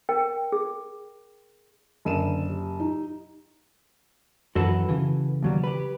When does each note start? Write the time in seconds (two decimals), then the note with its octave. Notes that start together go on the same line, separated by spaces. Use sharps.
0.09 A#4 G5
0.52 G#4
2.05 F#1 D3 D#7 E7
2.49 G4
2.80 D#4 G4
4.55 F#2 E3 F#4 A4 B4
4.89 C#3 E3
5.43 D#2 F#3 G3
5.64 G4 B4